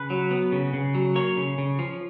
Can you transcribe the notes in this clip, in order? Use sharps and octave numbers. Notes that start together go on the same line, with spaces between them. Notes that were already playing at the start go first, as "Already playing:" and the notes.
Already playing: C#3 B4
F#3
B3
C#3
C#3
F#3
A#3 C#5
C#3
C#3
F3